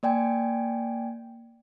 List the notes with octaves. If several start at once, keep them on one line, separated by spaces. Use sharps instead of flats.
A#3 D5 G5 G#5